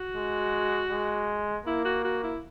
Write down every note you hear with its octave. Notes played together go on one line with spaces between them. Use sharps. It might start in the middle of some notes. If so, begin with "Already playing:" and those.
Already playing: F#4
G#3
G#3
A#3 E4
F#4
F#4
E4